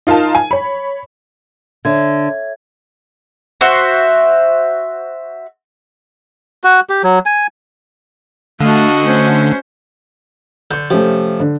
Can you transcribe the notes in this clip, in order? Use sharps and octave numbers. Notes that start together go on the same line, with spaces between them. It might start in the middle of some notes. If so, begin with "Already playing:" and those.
D#4 F4 A#4 F5 A5
G#5
C#5 B5
D3 C#5 E5 G#6
F#4 C5 E5
F#4
G4
F#3
G#5
D3 A3 F#4 D#5 F5 A5
A3 C#4 C5
D3 C#6 G6
C3 F3 A3 C#4 G4
D3